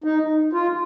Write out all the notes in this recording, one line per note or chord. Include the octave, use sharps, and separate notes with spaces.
D#4
F4